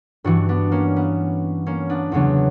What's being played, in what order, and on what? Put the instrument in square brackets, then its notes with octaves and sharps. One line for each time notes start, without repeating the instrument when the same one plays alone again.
[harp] G2 E3 D4 F#4
B3 D4
A#3 C#4
B3
A#3 C#4
B3 D4
E2 C#3 F#3 B3 D4